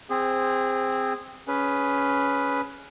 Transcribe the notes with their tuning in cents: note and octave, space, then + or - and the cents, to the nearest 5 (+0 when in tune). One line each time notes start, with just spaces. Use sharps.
C4 +0 G#4 -20 C5 +0
C#4 +10 G#4 +10 B4 +0